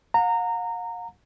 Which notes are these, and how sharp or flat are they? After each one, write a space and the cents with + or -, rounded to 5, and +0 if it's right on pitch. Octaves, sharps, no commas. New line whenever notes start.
F#5 -45 A#5 -20